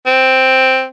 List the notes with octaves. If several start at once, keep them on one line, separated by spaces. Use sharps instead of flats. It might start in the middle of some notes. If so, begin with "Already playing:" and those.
C4